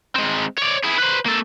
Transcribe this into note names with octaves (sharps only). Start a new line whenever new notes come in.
G#3 C4
C#5 D5
E4 G#4
B4 C5
A#3 A4